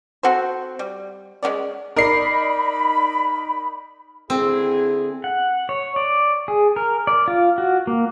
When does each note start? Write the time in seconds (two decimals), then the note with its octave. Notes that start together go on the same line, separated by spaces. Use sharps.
0.23 C4 F#4 A4 C5
0.79 G3
1.43 G#3 B3 C#4 D5
1.96 D#4 A#4 D5 B5 C7
4.30 D3 C4 E4 G#4
5.24 F#5
5.69 C#5
5.96 D5
6.48 G#4
6.76 A#4
7.07 D5
7.28 F4
7.58 F#4
7.87 A#3